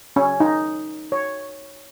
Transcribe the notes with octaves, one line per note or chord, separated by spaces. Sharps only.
C#4
D#4
C#5